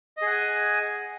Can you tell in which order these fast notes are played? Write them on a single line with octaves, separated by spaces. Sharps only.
D#5 G#4 F#5 G#5